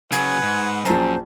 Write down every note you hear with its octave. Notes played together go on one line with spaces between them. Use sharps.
C#3 F#3 B4 F#5 G#5
G#2
A#1 F#2 C5 A5 A#5